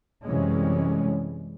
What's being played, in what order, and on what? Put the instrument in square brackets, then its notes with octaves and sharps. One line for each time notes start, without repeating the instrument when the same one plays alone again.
[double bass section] F#2 C3 E3 G3 G#3 C#4